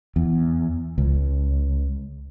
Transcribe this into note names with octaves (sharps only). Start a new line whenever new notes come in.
E2
C#2